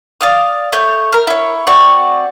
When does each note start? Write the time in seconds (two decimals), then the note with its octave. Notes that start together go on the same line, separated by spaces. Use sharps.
0.21 D5 F5 D#6
0.72 A3 C#5 G6
1.12 A#4 F6
1.27 E4 C#5
1.67 C4 F#4 D5 C#6